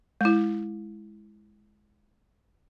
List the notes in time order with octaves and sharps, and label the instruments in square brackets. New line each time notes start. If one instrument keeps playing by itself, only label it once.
[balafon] G#3 E4